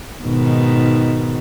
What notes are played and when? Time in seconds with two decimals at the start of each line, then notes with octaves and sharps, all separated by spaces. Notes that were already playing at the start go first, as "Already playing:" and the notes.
0.22 G#2 B2 D#3